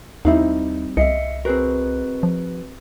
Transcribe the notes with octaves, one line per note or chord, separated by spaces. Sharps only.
D#2 G3 C4 D#4 E4 F5
C2 D#5 E5 C7 C#7
C4 F#4 G#4 A#4 B4
F3